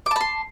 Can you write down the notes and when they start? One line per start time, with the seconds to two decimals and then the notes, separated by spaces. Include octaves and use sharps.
0.06 D6
0.11 A5
0.16 B5
0.21 C6